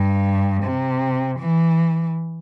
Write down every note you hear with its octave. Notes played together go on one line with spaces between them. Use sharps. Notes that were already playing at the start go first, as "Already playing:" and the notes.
Already playing: G2
C3
E3